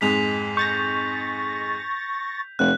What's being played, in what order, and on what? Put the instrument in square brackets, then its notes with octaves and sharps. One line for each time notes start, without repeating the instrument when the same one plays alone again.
[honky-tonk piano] F2 G#2 G#3 [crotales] B6 F7
[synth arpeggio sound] C#6 A6 A#6 [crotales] G6
[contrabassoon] F1 [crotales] F#6